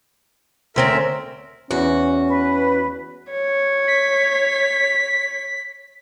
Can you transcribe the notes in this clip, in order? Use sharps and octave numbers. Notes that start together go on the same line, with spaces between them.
D2 C4 C#4 A#4 E5
E2 C#4 F#4
B4
C#5
B6